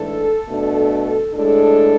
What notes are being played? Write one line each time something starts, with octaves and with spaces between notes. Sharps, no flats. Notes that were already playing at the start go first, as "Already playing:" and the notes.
Already playing: G#2 E3 A3 D4 A4
B2 A3 D4
A2 G#3 D4 A4